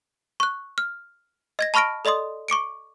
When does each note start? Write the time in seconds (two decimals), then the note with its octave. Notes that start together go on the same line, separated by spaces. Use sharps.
0.40 C#6 F#6
0.78 F6
1.59 D#5 G#6 A#6
1.74 A5 B5 C#6 F6 A#6 D7
2.05 A4 D5 D#5 C6 D#6
2.48 C#6 D6 C#7 D7